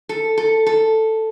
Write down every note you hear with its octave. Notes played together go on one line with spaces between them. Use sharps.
A4
A4
A4